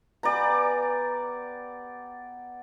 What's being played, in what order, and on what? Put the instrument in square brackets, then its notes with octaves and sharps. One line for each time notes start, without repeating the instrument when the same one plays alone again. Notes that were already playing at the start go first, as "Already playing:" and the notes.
[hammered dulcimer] B3 G4 G#5 [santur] D5 A#5